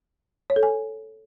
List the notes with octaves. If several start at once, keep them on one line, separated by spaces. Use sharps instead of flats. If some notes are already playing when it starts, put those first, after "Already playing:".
C#5
A4
G#5